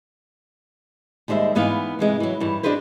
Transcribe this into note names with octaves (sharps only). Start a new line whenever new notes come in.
D#2 G3 G#3 C5 E5
G#2 E3 B3 B4 F5
C3 E3 G#3 B3
E3 F#3
G2 E3
D4 D#4 F#4 G#4 B4 C5